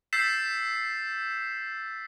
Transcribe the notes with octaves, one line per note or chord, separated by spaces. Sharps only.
E6 G6 A6 B6 C7 E7